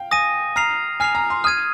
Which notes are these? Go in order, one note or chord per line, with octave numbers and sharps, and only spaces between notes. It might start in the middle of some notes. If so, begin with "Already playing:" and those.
Already playing: F5 G5
G#5 D#6 A#6 D#7
A#5 F6 C7 F7
G#5 F6 C7 F7
A#5
C6
D#6 F6 G#6 D#7